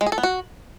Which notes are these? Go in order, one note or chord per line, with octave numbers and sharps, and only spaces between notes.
G#3
G#4
A4
B3
F#4